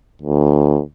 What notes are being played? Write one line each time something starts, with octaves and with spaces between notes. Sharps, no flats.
D2